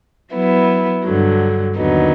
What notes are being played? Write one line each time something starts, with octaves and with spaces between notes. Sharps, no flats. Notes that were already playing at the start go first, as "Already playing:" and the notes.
F#3 B3 E4
G2 D3 F#3
D#2 D3 F#3 B3 D#4